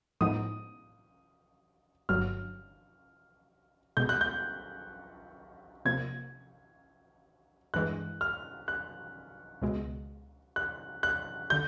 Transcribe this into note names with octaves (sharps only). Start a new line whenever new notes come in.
A2 F3 G#3 B3 D#4 D#6
G1 G2 D3 F#3 F6
B2 G#3 B3 G6
F#6
G6
C3 F3 A#3 G#6
G2 E3 G#3 F#6
F6
F#6
C#2 B2 G#3
F#6
F#6
D3 G6